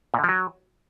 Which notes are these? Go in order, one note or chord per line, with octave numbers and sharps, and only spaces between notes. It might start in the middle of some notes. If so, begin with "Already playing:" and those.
A#2
D3
F3
F#3